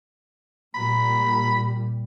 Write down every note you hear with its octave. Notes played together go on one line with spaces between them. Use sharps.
A#2 G3 B5